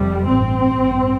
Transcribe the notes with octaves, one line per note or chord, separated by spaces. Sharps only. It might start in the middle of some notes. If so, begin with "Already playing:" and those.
Already playing: F1 F2 C3 G3
A1 G2 C4
A1 G2